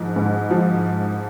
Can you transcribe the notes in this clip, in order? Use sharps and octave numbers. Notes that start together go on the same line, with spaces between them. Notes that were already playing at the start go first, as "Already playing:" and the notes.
Already playing: G#2 F3
G#2
F3